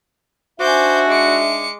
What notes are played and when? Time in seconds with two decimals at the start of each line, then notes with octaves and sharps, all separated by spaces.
0.60 D4 D#4 F#4 C5 E5 G#5 D6 G6
1.10 G#3 D6 C#7